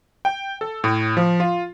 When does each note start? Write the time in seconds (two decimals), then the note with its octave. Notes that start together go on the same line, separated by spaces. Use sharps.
0.25 G5
0.61 A4
0.84 A2
1.17 F3
1.40 F4